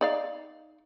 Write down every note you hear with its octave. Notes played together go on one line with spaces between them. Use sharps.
D#4 D5 F5